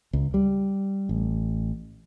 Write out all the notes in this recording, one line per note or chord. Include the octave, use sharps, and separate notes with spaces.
C#2
G3
A1